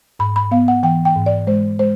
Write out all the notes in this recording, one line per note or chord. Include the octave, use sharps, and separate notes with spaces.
G#2 B5
B5
B3 F5
F#5
E3 G5
G5
G#2
D5
G#3 C5
G#3 C5